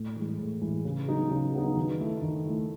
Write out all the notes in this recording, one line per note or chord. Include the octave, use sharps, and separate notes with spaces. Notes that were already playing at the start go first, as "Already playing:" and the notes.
Already playing: A2
E3 G#3
A2
E3 G#3
C#3
F#3 B3 D#4
C#3
F#3 B3 D#4
D#3
A3 E4
D#3
A3 E4